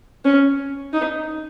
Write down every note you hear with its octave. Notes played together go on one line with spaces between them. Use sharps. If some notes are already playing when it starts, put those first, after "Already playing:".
C#4
D#4